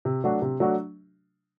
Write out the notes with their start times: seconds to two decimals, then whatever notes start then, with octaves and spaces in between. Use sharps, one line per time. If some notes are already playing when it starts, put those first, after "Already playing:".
0.05 C3
0.24 F#3 A3 D4 F#4
0.42 C3
0.60 F#3 A3 D4 F#4